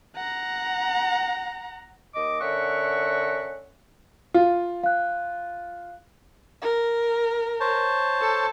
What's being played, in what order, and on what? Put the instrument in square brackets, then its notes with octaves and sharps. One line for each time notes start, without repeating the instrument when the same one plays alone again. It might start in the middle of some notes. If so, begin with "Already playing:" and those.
[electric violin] F#5 A#5
[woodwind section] D#2 D#5 D6
D3 C#4 A#4 E5 F#5 C#6
[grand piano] F4 [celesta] F5
[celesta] F5 F#6
[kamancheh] A#4
[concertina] C5 C#5 A5
[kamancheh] A4